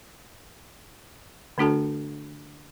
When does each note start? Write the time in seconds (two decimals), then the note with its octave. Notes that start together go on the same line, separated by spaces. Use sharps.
1.58 D3 A3 D4 F#4 A4 A5